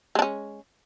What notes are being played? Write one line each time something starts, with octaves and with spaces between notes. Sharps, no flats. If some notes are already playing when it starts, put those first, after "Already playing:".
G#3 C#4 D4